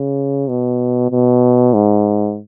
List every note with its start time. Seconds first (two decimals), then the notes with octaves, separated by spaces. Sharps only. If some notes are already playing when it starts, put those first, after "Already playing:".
Already playing: C#3
0.49 B2
1.11 B2
1.74 G#2